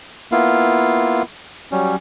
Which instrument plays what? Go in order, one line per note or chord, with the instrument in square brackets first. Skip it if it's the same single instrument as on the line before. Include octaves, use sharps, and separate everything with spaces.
[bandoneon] A#3 B3 E4 F4 F5
F#3 G3 C#4